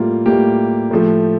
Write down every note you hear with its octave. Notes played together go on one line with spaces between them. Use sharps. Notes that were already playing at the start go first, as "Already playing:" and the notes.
Already playing: A2 G3 A#3 F4
A2 G3 A#3 G4
A2 F3 A3